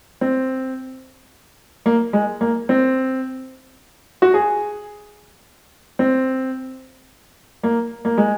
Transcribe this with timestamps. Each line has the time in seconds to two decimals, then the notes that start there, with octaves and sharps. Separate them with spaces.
0.21 C4
1.86 A#3
2.13 G#3
2.41 A#3
2.69 C4
4.22 F#4
4.34 G#4
5.99 C4
7.63 A#3
8.05 A#3
8.17 G#3